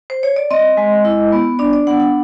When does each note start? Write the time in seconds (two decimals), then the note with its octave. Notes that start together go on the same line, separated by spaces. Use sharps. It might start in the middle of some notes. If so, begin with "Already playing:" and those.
0.10 C5
0.23 C#5
0.36 D5
0.51 C4 D#5
0.77 G#3
1.05 E4
1.32 B3
1.59 D4 D5
1.73 D5
1.87 B3 F#5
2.00 F#5